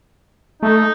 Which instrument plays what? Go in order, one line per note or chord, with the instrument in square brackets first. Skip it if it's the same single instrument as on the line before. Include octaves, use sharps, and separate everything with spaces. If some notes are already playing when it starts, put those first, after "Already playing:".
[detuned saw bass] A3 [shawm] D#4